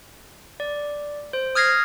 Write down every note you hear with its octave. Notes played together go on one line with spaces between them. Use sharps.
D5
C5
D#6 F6 G#6 A#6 C7